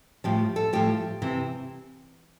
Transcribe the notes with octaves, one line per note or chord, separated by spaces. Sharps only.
A2 F3 G4
A4
A2 F3 G4
C3 E3